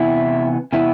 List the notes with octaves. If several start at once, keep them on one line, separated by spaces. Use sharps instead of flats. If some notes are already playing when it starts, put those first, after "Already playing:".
Already playing: C3 E3 B3 E4
C3 E3 B3 E4